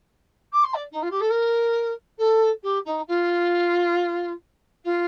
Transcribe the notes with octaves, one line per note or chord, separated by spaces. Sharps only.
D6
C6
D5
D#4
F4
G4
A4
A#4
A4
G4
D#4
F4
F4